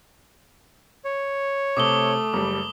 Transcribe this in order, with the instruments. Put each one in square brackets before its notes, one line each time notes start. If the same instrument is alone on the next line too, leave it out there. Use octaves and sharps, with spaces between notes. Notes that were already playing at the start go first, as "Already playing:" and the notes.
[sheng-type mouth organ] C#5
[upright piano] C3 [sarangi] A3 [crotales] D6 D#6 G7
[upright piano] F#1 G3 [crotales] D6